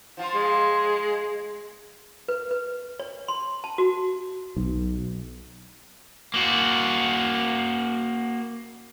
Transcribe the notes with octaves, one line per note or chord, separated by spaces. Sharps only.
F3 F4 C5
G#3
B4
B4
C#5
C6
A5
F#4
B1
A#3 F#4